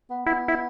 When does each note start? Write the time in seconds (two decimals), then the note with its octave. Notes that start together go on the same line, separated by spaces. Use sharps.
0.10 B3
0.26 B3 E4
0.48 E4